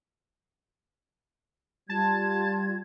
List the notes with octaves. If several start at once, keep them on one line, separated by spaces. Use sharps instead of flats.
G3 F4 A5 G#6